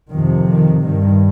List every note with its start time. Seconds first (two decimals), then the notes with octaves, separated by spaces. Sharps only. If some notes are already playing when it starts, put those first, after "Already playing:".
0.11 F2 C3 D#3
0.48 D#3
0.84 G2 D#3